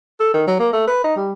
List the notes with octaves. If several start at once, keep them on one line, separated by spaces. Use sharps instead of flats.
A4
D#3
F#3
A#3
A3
B4
D#4
G3